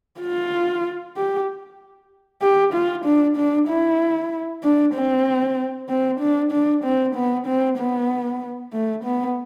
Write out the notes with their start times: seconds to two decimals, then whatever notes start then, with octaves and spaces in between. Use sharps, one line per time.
0.21 F4
1.17 G4
2.42 G4
2.74 F4
3.05 D4
3.37 D4
3.69 E4
4.63 D4
4.94 C4
5.89 C4
6.20 D4
6.52 D4
6.84 C4
7.15 B3
7.47 C4
7.78 B3
8.73 A3
9.04 B3